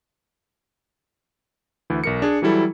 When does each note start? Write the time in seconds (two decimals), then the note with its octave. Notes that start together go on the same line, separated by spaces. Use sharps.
1.90 D2 E3
2.04 B1 A#4 C#7
2.22 D4 G#4
2.42 E3 F#3 G3 E4 A4